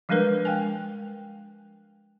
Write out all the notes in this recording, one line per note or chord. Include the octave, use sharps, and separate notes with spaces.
F3 G3 G#3 D4 A#4 B4
G#3 G5 G#5